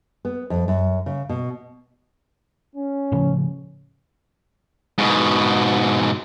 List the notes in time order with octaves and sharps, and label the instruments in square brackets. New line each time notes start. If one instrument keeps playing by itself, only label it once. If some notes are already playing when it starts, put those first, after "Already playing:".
[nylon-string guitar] B3
F2
F#2
C#3
B2
[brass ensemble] C#4
[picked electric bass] A2 C#3 F3
[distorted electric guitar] G#2 B2